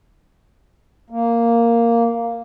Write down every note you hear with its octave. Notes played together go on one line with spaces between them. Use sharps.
A#3